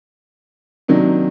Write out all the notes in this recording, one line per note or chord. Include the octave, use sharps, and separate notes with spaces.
C3 D#3 F#3 A#3 D4